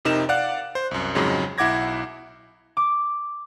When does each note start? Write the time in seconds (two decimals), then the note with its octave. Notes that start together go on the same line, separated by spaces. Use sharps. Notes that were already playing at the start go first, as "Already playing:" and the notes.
0.05 F2 C3 D#4 A#4 E7
0.29 D5 F5 F#5 F#6
0.75 C5
0.91 C2 F#2
1.15 F2 G#2 C#3 F#3 G#3
1.58 B1 E4 F#5 D6 G#6 A#6
2.77 D6